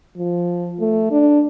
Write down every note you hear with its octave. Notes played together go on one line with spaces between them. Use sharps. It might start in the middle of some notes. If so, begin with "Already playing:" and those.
F3
A3
D4